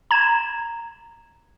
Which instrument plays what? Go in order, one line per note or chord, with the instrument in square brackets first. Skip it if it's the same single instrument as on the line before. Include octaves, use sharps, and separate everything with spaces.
[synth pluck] A#5 G#6 E7